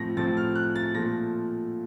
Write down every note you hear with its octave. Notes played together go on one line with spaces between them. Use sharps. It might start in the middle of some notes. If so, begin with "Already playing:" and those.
Already playing: A2 F3 C4 A#6
A2 F3 C4 A6
F6
F#6
A6
A#2 F3 A3 A#6